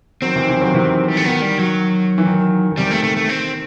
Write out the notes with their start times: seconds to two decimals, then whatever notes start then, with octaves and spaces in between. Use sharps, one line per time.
0.22 D#3 F#3 C4
0.35 C3 E3
0.48 C3 E3
0.61 D#3 F#3
0.74 C3 E3
1.08 G3
1.17 A3
1.25 D#3 B3
1.42 G3
1.59 F#3
2.18 E3
2.27 D#3
2.72 D#3
2.77 C3 G3
2.91 A3
3.04 A3
3.17 A3
3.29 C4